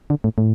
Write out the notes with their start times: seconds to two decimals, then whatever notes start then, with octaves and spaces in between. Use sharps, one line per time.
0.10 D3
0.24 A2
0.38 A2